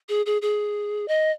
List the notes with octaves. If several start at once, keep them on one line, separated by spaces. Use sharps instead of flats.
G#4
G#4
G#4
D#5